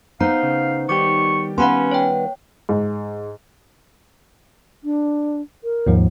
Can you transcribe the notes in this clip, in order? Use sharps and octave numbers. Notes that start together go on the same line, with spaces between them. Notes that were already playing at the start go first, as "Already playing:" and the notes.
B3 D#4 C5 F5 A#5
C#3
D#3 G3 G4 C#6 D6
B3 C#4 B4 F5 F#5 B5 C6
C#5 G5
G#2
D4
A#4
D#2 G#2 F3